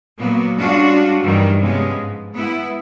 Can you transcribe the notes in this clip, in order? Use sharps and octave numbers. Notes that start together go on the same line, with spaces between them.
A#2 F#3 A#3 B3
G3 G#3 C#4 D4 F4 F#4
G2 D#3 E3 F#3 G3
C3 F3 G#3 B3 C#4
G#2
G#3 B3 E4